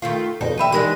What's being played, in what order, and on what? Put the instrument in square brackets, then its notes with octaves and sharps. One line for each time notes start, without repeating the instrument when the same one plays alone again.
[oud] D#3 A3 F4
[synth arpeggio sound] F2 B2 D3 [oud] D#4
[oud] D#2 G3 E5 [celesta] G5 B5 D#7
[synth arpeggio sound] D#3 D#7 [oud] E3 G#3 D4 [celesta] G4 A#6